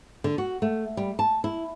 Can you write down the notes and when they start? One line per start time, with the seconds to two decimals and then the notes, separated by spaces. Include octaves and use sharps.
0.24 D3
0.38 F#4
0.62 A3
0.97 G3
1.19 A5
1.44 E4